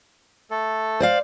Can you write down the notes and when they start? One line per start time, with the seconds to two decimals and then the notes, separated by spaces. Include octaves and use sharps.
0.51 A3 A4
1.00 C5 D5 F5